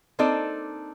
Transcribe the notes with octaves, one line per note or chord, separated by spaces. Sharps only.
A#3 C4 D4 D#4 A4 D5